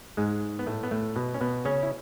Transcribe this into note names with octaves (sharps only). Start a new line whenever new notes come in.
G#2 G#3
B3
A2 A3
B3
A2 A3
B2 B3
C#4
B2 B3
C#3 C#4
E4